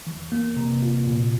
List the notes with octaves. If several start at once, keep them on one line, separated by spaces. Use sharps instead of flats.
E3
A#3
C3
F4
A#2